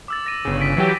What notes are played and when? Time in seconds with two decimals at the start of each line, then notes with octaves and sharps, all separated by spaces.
0.08 D6 E6 A6
0.26 A#6 D#7
0.45 G1 C#3
0.61 B6 D7
0.77 E3 F#3 G4